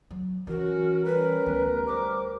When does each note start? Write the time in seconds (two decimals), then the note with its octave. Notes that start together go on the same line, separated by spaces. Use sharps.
0.11 F#3
0.47 E3 C#4 F#4 A#4
1.04 G3 C#4 A#4 B4
1.46 D2 B3
1.86 G3 C5 D6